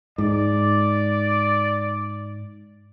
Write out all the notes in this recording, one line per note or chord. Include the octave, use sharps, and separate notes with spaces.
G#2 D5